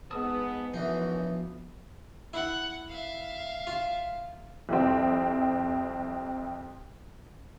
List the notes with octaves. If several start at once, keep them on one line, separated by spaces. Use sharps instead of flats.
G#2 B3 A5 D#6 E6
F#2 E3 F3 B3 D4 D#4 F#4
E4 F#5
E5 F5
F4
C2 F2 C4